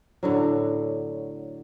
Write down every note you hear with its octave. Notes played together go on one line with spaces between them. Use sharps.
A2 D3 F#3